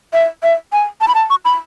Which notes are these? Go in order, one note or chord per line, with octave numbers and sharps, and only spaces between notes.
E5
E5
G#5
A5
B5
A5
C#6
B5